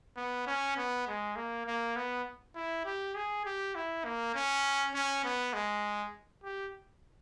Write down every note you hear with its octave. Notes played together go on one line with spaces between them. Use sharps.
B3
C#4
B3
G#3
A#3
A#3
B3
E4
G4
G#4
G4
E4
A#3
C#4
C#4
B3
G#3
G4